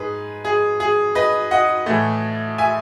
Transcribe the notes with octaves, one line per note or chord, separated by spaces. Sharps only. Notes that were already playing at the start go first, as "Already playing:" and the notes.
Already playing: G#2 G#4 B4
G#4
G#4
B4 D#5
D#5 F#5
A2 E3 A3
E5 G#5